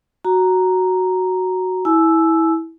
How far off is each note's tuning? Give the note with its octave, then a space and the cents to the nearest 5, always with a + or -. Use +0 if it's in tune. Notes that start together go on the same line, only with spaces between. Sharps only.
F#4 +0 A#5 +0
E4 -15 G#5 +40 E6 +0